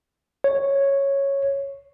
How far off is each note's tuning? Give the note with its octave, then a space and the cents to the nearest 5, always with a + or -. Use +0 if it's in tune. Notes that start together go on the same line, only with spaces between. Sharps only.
C#5 -5